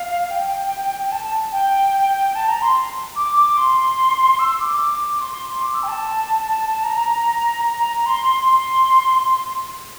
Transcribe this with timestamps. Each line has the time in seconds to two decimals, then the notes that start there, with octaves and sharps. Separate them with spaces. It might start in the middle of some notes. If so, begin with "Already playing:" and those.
Already playing: F5
0.31 G5
1.12 A5
1.52 G5
2.35 A5
2.48 A#5
2.62 C6
3.16 D6
3.37 D6
3.57 C6
4.39 E6
4.59 D6
4.80 D6
5.21 C6
5.61 D6
5.74 E6
5.83 G5
5.88 A5
6.84 A#5
7.65 A#5
8.06 C6
8.47 C6